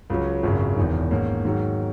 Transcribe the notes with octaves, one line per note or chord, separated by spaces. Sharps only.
C#2 C#3 F#3 C#4
G#1 F#2 C#3
E1 E2 D#3
G#2 D#3 A#3 C#4
G#2 D#3 F#3